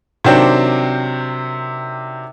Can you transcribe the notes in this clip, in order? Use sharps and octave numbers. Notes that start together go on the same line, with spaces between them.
C3 D#3 F#3 C4 D4